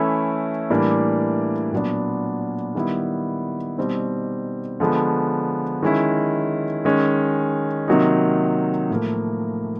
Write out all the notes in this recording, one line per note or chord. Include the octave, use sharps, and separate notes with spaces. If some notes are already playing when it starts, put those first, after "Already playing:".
Already playing: E3 A3 C#4 E4
A2 E3 G3 A#3 D4
A#2 F#3 B3 D4
D#3 G3 B3 E4
B2 G3 C4 D#4
D3 F3 G#3 B3
D#3 G#3 C#4 E4
D#3 G#3 C#4
C3 D#3 F#3 A#3 D#4
A2 F3 A#3